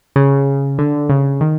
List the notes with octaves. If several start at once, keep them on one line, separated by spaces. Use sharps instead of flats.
C#3
D3
C#3
D#3